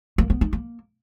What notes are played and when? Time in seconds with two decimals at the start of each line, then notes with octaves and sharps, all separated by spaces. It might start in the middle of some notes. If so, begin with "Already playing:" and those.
0.18 A#3
0.30 B3
0.41 D#4
0.53 A#3